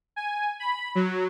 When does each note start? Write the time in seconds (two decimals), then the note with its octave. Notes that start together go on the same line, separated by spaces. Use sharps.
0.16 G#5
0.59 B5
0.95 F#3